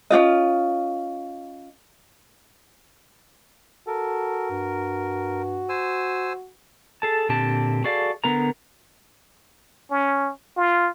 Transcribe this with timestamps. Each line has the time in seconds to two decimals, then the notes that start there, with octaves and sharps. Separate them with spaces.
0.10 C#4 D4 F4 D#5
3.87 F#4 A4 A#4
4.50 G2
5.69 C5 G#5 E6
7.02 G#4 A4 A5
7.29 A#2 D3 C4 G4 A5
7.84 F#4 G#4 A4 D5 F5
8.24 D3 B3 A#4 A#5
9.91 C#4
10.57 F4